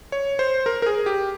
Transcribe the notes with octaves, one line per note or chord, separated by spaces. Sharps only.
C#5
C5
A#4
A#4
G#4
G4